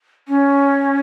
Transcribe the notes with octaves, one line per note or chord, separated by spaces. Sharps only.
C#4